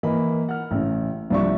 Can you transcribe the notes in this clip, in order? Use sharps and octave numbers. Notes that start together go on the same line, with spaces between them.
E3 A#3 D#5 B5
F#5 F6
A1 C#3
C2 F3 D4 D5 E5 C#6